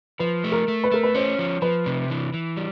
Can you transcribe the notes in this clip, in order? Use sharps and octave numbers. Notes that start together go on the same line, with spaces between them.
F3 B4
A3
A#4
A3
B4
A3 A#4
B4
C#4 C5
F3
F3 B4
C3
E3
E3
G3